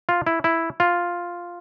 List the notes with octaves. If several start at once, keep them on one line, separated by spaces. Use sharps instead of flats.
F4
E4
E4
F4